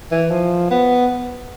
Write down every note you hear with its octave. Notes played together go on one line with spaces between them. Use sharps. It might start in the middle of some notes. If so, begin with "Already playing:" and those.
E3
F3
B3